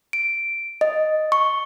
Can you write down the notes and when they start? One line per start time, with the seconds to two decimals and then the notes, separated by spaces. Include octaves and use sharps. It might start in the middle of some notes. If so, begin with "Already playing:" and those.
0.13 D7
0.81 D#5
1.32 C#6